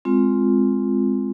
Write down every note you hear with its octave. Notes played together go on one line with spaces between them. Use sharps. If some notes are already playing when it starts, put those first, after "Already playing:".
G#3 C4 F4